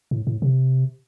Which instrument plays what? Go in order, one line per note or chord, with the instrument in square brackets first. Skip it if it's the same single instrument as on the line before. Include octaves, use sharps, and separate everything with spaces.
[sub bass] A2
A2
C3